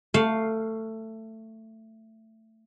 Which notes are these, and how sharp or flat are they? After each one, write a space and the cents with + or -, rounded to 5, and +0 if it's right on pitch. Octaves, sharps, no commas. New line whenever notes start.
A3 +15 F5 +0